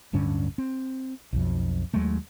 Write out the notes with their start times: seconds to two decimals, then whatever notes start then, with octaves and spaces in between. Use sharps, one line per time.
0.13 D1 G2 D3 C#4
0.58 C4
1.33 B1 F2
1.94 D#2 F#3 G#3 A3